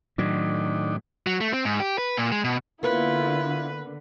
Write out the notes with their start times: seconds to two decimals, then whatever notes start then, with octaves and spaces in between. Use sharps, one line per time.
0.18 A2 D#3 F#3 D4
1.27 F#3
1.41 A3
1.53 C4
1.65 G#2
1.80 G4
1.98 B4
2.17 A#2
2.32 G#3
2.44 B2
2.83 D3 A#3 B3 E4 F4 B4